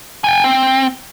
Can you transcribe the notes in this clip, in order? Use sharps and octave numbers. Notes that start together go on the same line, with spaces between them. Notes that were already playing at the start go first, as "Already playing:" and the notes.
G5 G#5
C4